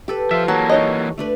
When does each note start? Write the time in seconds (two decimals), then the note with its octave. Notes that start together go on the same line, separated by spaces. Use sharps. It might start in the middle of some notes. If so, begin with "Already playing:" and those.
0.08 G4 A4 B4
0.31 F3 F4 E5
0.48 E3 F#3 A#3 A5
0.70 D#4 C#5 D#5
1.18 A3 D4 B4